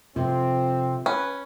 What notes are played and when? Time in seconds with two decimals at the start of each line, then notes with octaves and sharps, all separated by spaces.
0.16 F2 C3 C4
1.06 C#4 B4